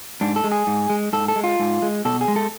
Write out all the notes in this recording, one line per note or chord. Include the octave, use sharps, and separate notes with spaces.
G#2 D4
A4
G#3
G#4
G#2
G#3
G#2 A4
A4
G#3
F4
G#2
G#3
B2 A4
G#4
G#3
A4